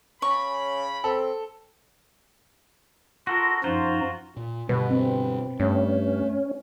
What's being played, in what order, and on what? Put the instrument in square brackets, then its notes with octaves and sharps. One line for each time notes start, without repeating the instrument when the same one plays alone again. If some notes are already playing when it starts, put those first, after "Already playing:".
[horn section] C#3 B5 [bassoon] C#4 [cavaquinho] C#6
[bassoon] C4 [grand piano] A4
[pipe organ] F4 [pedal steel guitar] F#4 A4 A#4
[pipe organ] F#2 F3 D#4 [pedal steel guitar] F4 F#4 C5
[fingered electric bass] A#2
[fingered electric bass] G2 D3 G3 [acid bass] B2 [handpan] B4
[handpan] C4
[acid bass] G2 [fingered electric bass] A3 [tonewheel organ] C#4